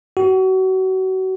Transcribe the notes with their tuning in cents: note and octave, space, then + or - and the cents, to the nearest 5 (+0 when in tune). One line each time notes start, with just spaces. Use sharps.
F#4 +30